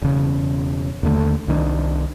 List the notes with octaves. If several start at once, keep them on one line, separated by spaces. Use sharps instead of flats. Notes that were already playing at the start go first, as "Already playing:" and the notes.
E1 C#3
D#2 D3 A3
C2 D#3 C4 D4